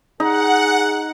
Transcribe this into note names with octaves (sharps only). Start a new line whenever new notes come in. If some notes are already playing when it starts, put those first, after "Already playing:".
D#4 G#4 F#5